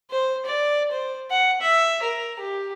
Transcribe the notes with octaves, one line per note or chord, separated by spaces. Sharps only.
C5
D5
C5
F#5
E5
A#4
G4